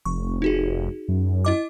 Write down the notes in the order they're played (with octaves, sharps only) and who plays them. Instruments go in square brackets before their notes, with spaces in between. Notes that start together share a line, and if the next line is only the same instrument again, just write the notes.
[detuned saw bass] F1 [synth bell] C#6
[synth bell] D#4 F#4 G#4
[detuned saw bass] F#2
[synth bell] E4 D#5 D6